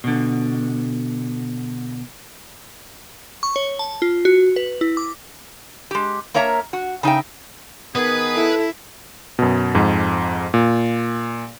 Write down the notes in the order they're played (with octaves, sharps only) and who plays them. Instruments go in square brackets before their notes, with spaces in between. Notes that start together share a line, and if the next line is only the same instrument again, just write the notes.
[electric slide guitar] B2 D3
[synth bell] C#6
C#5
A5
F4
F#4
B4
E4
D6
[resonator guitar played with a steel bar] G#3 G4
A#3 A#4 C#5 E5 A#5
F#4
C#3 D#4 E5 G5
[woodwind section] D#3 B3 G#4 [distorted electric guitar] B4
[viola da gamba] E4 [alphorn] A4
[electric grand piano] F#2 B2
F2 G#2
A#2